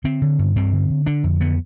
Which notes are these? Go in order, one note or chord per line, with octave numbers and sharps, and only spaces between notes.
D3 C4
D3
G2
G2 C4
D3
D3
D3 D4
F2
D3 B3